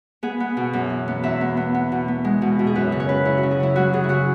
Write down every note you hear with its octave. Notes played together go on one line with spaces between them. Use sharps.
B3 G#4
B3
B2
F#2
E3
B3
E2 E5
B3
B3
B3
B2
B3
G#3
B2
B2
G#4
F#2 B4
C#3
C#5
C#3 B4
C#3 E4
F#4
C#3
G#4
F#3 E4
F#3 F#4
C#3 G#4
E4
F#3 F#4